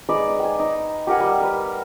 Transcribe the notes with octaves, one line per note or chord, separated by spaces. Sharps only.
G#3 D#4 B4 D5
G5 G#5
D#4
G4 A#4 F#5 G#5
G3
A#4 B4